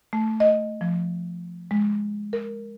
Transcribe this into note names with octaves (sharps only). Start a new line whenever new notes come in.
A3
D#5
F3
G#3
A#4